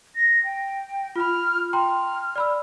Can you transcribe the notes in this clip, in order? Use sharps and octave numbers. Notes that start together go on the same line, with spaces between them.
A#6
G5
F4 B5 F6
G5 A#5 C6 F6
D5 B5 E6